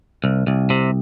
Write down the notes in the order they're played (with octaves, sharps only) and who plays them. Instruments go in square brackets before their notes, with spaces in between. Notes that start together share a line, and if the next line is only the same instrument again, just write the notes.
[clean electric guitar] C2
C2
C3